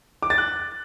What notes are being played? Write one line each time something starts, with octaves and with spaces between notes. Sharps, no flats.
D6
A6
F#6